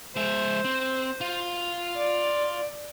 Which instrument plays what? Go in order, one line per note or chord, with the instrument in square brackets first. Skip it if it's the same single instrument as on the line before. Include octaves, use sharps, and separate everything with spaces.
[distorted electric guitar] G#3 E5 [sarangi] C5
[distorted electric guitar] C4
F4
[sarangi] D5